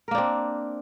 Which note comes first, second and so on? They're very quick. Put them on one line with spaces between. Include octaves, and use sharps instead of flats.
A#4 A#3 D4 C4